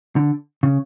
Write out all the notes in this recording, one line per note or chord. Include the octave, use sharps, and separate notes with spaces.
D3
C#3